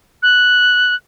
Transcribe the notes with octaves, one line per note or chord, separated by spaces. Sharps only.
F#6